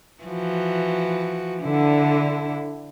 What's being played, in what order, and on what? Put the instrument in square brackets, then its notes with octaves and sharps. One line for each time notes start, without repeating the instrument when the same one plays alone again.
[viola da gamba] E3 F3 F#4
[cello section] D3 [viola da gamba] E4